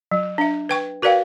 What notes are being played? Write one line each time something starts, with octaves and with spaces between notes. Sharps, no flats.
F#3
D4 E5
B4 G5 C#6
F#4 A#4 B4 D5 F5 G5